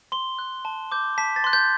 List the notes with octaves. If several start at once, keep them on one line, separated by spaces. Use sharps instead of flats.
C6 G7
F#6
A5
D6 G6
A5 B6
A6
C6 F#6
G6